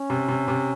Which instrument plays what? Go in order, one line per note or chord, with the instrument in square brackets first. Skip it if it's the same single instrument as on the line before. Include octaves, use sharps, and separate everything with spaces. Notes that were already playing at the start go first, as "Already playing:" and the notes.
Already playing: [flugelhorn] C#4
[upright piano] C3
C3
C3